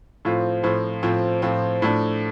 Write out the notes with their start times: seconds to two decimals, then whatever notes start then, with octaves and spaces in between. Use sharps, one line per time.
0.25 A2 F3 C4 F4
0.63 A2 F3 C4 F4
1.03 A2 F3 C4 F4
1.42 A2 F3 C4 F4
1.82 A2 F3 A3 D4